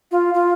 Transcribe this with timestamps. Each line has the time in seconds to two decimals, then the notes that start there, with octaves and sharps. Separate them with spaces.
0.11 F4
0.34 F4